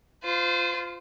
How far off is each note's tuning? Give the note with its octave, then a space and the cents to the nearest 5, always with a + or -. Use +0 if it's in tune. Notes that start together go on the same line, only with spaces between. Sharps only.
F4 +0 C5 -30